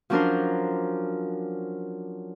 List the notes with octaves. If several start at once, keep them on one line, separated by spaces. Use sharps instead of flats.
F3 F#3 C#4 D4 A#4 C5